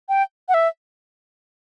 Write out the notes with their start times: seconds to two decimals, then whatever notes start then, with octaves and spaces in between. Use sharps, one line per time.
0.09 G5
0.49 F#5
0.54 E5